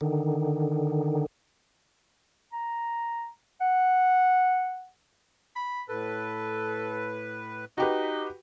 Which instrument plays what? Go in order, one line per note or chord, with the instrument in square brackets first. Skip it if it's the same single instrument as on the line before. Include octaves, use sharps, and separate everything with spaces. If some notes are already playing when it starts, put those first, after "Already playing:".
[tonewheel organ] D3 D#3
[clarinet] A#5
F#5
[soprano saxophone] B5
[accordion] A2 B4 [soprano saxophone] A4
[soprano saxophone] D#4 [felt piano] F#4 G4 B4